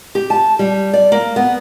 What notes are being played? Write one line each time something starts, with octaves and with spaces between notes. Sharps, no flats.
G4
A5
G3
D5
A#3
B3